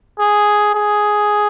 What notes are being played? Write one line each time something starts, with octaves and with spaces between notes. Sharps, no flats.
G#4
G#4